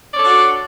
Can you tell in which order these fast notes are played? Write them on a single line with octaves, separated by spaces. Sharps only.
D5 C#5 A4 D4 F#4